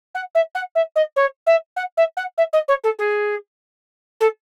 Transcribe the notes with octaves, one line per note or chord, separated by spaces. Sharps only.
F#5
E5
F#5
E5
D#5
C#5
E5
F#5
E5
F#5
E5
D#5
C#5
A4
G#4
A4